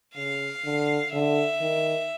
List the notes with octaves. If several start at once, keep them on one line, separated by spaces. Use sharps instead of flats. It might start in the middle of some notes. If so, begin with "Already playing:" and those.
C#3 F5
D3
D3 E5
D#3